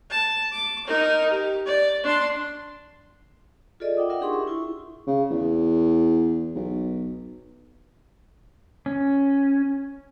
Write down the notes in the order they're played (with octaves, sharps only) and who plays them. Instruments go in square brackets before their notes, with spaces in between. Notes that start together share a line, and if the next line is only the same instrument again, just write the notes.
[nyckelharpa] A5
D6
D#4 A#4
G4
D5
D4 C6
[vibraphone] F4 G#4 A4 D5 D#5
E5 F#5 G5 D6 D#6
F4 A#4 E5 F#5
D4 D#4 G4 G#4 C6 C#6
E5
E4 F4 C#6
[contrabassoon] C#3
E2
B1
[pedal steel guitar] C#4